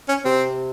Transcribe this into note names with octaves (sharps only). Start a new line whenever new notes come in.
C#4
C3 C4